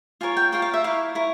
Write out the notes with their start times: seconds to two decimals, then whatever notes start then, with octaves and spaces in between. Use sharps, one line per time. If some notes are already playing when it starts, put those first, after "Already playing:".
0.21 F4 A#4 C#5 G#5
0.37 G5
0.52 F4 A#4 C#5 G5
0.62 F5
0.74 E5
0.84 E4 A#4 C#5 F5
1.15 E4 A#4 C#5